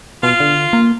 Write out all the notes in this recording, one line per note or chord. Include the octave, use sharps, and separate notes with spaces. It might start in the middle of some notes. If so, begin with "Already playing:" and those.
B2 F4
D3
A#3